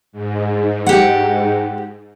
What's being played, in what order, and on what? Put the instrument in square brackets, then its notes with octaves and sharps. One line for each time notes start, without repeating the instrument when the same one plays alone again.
[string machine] G#2
[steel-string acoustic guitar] G4 F#5